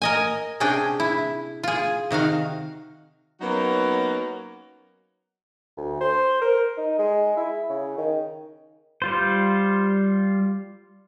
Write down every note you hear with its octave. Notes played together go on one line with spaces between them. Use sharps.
A#4 D#5 G#5
C3 C#4 D4 G#4 G5
E4
F4 G#4
C3 D#3 F#4 F5
F#3 A#3 B3 C#4 D#4 F#4
D2
C5
A#4
D#4
G#3
E4
C#3
D#3
G3 F4 C5